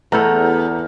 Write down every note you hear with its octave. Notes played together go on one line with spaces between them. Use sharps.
E2 A3 B3 E4 A4 A#5 F6 G6